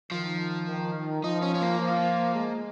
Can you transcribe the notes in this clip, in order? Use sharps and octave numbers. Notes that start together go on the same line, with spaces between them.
D#3 F3
D#3
F3 D#4
C#4
C#4
A#3
F3
G#3